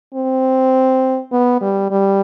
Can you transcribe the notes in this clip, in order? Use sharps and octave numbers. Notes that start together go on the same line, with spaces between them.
C4
B3
G3
G3